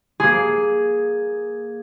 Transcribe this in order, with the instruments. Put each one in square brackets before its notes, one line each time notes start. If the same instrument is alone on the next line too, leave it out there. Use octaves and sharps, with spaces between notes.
[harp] A#3 G#4